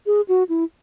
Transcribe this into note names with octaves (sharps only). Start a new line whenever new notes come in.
G#4
F#4
E4